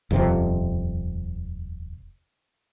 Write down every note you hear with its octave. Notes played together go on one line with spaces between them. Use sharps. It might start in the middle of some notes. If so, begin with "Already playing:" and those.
D#1 F2 C3